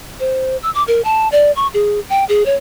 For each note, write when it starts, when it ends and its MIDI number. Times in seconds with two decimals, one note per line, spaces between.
0.20 0.57 72
0.63 0.70 88
0.75 0.83 86
0.88 1.01 70
1.05 1.28 81
1.32 1.52 74
1.56 1.67 85
1.74 2.00 68
2.10 2.25 79
2.29 2.46 68
2.46 2.56 73